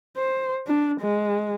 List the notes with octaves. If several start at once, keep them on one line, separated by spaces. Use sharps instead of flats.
C5
D4
G#3